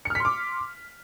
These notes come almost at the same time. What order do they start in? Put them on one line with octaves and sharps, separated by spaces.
C#7 F6 B6 C6 D6